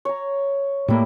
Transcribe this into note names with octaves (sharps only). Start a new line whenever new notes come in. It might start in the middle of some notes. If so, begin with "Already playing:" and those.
C#5 A#5
A2 G3 A#3 E4